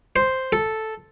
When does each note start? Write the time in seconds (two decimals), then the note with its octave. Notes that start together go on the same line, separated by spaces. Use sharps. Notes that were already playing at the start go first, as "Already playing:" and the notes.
0.16 C5
0.52 A4